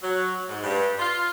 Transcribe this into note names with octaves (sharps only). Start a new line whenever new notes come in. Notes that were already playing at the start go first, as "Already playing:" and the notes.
F#3
G#2
G2
F4